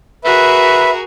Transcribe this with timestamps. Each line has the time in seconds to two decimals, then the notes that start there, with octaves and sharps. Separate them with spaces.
0.24 F#4 G#4 A#4 B4 E5